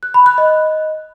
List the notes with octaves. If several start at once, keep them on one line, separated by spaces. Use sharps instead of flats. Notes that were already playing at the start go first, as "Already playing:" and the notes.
F#6
B5
F#6
D#5